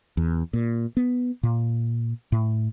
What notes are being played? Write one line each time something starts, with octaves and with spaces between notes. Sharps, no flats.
E2
A#2
B3
A#2
A2